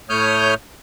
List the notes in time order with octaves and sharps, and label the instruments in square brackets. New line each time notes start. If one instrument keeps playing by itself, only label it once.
[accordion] A2 A3 C#5 D#6 F6 G6